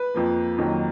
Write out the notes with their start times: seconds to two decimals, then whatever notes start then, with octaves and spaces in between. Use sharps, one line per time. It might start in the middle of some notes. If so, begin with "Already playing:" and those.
Already playing: B4
0.14 F2 F3 A#3
0.58 F2 D#3 F#3 A#3